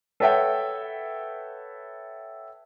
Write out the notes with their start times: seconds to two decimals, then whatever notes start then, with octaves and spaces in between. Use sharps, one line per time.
0.20 A4 B4 C#5 E5 F#5 G5